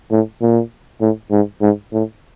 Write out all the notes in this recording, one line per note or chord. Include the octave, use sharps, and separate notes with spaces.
A2
A#2
A2
G#2
G#2
A2